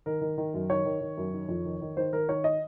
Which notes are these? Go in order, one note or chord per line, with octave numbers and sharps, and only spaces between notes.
D#3 A#4
D#3
D#3
F#2
D#3 C#5
D#3
D#3
F#2
D#3
F2
D#3
D#3
D#3 C5
D#3 A#4
D#3 C#5
D#5